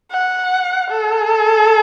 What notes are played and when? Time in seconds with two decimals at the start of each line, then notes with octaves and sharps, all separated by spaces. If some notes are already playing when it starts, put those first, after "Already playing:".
0.11 F#5
0.91 A4